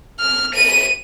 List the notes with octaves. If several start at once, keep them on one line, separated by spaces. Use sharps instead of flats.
F6
D#7